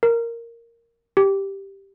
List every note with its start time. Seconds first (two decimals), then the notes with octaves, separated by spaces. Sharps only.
0.03 A#4
1.17 G4